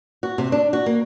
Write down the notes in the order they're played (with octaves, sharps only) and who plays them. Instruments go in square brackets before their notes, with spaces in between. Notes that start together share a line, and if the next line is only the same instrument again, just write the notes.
[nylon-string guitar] F#4
C3
D4
F#4
A#3